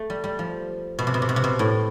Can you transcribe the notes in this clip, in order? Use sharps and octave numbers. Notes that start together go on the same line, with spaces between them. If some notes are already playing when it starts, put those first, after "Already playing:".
Already playing: A3
G3
G3
F3
B2
C3
B2
C3
B2
C3
B2
A2